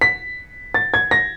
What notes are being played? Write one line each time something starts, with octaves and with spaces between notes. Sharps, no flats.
B6
A6
G#6
A#6